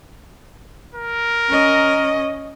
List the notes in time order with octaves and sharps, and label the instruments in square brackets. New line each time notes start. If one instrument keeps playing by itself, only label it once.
[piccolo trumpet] A#4
[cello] C#4 D#5